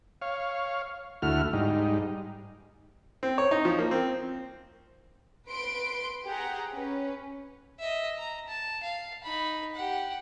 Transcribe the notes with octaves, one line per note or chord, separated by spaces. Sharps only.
C#5 F5
D2 A3 E4 F#4 F6
G#2 G3 D#4
C4
C#5
D#4
F3
A#3
C4
B4 C6 D7
G4 G#4 F#5 A#5
C#4 B4
D#5 E5
A#5
A5
F5
D#4 B5
G4 F#5